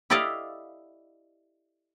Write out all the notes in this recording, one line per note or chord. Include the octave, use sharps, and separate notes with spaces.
E4 G4 A4 D5 D#5 F5